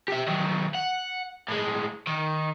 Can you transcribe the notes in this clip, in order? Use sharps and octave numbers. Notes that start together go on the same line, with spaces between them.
G4 E5
D#3 F#3
F#5
A2 G#3
D#3